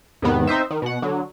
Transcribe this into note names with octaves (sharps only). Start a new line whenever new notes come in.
E2 G#2 C3 D#3 B3
C4 D#4 C5 E5
D#3
B2 F#5
D3 F#3